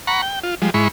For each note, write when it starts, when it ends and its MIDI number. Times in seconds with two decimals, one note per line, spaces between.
0.07 0.21 78
0.07 0.21 82
0.07 0.21 83
0.07 0.21 85
0.22 0.39 79
0.43 0.55 65
0.62 0.70 53
0.62 0.70 55
0.62 0.70 56
0.74 0.88 44
0.74 0.88 56
0.74 0.88 64
0.74 0.88 83
0.74 0.88 85